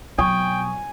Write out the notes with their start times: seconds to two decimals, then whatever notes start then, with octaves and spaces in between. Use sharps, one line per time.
0.19 B2 F#3 G5 G#5 C#6 D#6